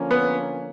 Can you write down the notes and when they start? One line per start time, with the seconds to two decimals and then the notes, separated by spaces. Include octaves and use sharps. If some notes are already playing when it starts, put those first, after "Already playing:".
Already playing: D3 F3 A#3 C#4
0.11 B3